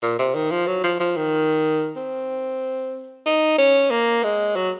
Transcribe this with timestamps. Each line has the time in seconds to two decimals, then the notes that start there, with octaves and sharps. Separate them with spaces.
0.03 A#2
0.19 C3
0.35 D#3
0.51 F3
0.67 F#3
0.84 F3
0.99 F3
1.16 D#3
1.96 C4
3.26 D#4
3.58 C#4
3.91 A#3
4.23 G#3
4.56 F#3